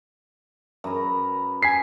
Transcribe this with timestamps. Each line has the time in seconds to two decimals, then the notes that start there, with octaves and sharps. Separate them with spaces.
0.84 F#2 B4 A#5
1.63 G#5 B6 C7